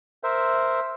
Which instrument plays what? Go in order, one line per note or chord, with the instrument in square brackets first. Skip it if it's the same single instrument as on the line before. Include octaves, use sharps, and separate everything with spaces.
[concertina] A#4 C5 E5